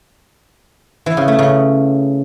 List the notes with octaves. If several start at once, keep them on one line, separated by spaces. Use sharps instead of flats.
E3
C#3
A3
C#3